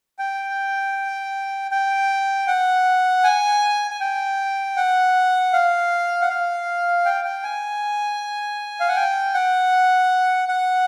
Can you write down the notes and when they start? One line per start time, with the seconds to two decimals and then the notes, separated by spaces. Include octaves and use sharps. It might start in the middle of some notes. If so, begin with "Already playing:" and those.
0.19 G5
1.71 G5
2.48 F#5
3.24 G#5
3.91 G#5
4.00 G5
4.77 F#5
5.53 F5
6.21 F#5
6.29 F5
7.05 G5
7.24 G5
7.44 G#5
8.80 F5
8.88 F#5
8.96 G5
9.34 F#5
10.48 F#5